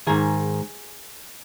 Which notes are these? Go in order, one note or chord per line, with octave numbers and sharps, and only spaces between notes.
G#2 D#3 G#4